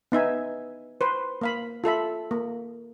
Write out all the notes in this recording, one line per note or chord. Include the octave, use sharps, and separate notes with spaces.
B3 D#4 E5 G#5
B4 C5
A#3 F5 B5
F4 A4 E5 B5
A#3